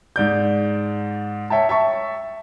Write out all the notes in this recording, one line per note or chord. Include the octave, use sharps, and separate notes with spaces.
G#2 D5 G6
C#5 E5 G5 A5
E5 A5 C#6